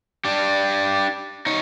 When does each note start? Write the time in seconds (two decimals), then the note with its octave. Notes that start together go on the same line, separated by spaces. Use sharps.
0.25 D4 G4
1.46 D#4 C#5